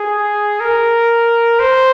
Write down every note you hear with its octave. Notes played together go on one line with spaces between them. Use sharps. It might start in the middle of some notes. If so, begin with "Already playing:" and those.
Already playing: G#4
A#4
C5